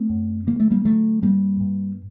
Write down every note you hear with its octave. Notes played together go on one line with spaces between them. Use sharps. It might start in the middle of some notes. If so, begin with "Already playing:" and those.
Already playing: A3 C4
F#2
D3 A#3
A3
G3 A#3
D3 F#3 A3
G2 G3 A#3
G2